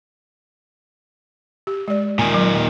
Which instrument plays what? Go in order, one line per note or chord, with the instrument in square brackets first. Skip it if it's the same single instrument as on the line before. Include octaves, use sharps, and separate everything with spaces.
[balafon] G4
G#3 D5
[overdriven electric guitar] A#2 D#3 [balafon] G#5
[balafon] F#3